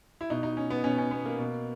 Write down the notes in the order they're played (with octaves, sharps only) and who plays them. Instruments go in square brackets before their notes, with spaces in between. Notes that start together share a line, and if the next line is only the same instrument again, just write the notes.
[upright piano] E4
B2 D#4
D#4
C#4
B3
B2 C#4
C#4
B3
A#3
B2